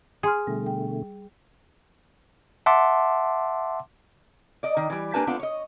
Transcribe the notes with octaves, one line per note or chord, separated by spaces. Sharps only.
G#4 G#5 C6 F6
B2 D3 G3 A3
G5
E5 F#5 A5 C6 D6
D5 D#5
D#3
E3 G3
A#3 D4 G4 B4 G#5 A5
A3 B3 C4 D4 F4
C#5 D#5